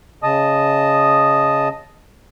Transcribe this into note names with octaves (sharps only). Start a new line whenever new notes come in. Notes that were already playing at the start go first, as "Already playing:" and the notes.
C#3 D#5 A5 D#6